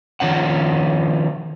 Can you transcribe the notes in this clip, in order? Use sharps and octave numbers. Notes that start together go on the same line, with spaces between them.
D#3 F3 C#4 F#5